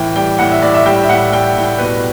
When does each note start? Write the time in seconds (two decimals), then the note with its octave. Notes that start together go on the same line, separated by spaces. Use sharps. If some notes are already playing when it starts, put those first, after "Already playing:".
Already playing: A2 E3 G5
0.16 G3 G5
0.39 A2 F#5
0.51 E5
0.62 A2 D5
0.74 E5
0.85 G3 G5
1.03 E5
1.09 A2 F#5
1.32 G3 G5
1.56 A2
1.63 G5
1.78 B2 B4